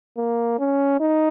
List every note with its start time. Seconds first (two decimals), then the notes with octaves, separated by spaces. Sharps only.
0.17 A#3
0.59 C#4
1.00 D#4